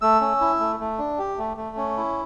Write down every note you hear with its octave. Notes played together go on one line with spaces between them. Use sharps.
A3 E6
C#4
E4
A3
A3
D4
G4
A3
A3
C#4
E4